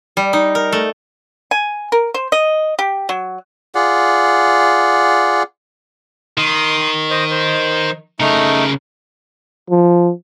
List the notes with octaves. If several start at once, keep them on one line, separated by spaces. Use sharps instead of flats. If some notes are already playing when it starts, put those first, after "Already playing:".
G3
D#4
A#4
A3
G#5
A#4
C5
D#5
G4
F#3
F4 G#4 D5 F#5
D#3 C6 D#6
C5 D#5
C5
C#3 A3 D#4 A#4
F3